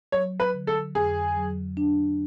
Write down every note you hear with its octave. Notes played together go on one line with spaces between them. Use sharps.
F#3 C#5
B4
D3
A4
F2 G#4
F#3
D4